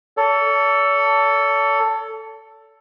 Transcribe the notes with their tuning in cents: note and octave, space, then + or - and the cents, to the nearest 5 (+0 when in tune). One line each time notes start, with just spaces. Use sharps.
A4 +10 C#5 +45